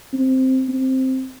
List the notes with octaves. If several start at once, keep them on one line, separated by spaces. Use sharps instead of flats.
C4
C4